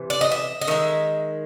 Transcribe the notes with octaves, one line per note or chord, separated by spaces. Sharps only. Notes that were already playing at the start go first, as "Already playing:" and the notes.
Already playing: C3 E3
D5
D#5
E5
D#5
D#3 G#3 E5